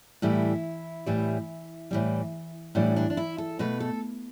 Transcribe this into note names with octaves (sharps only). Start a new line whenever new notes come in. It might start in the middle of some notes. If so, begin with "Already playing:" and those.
A2 E3 G3 E4
A2 E3 G3
A2 E3 G3
A2 E3 G3 D4
D4
D4
E4
A4
B2 A3 B4
A4